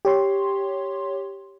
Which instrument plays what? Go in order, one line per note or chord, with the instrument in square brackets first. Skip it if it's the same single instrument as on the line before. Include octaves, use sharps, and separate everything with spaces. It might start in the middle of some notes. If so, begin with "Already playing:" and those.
[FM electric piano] G4 C#5 C6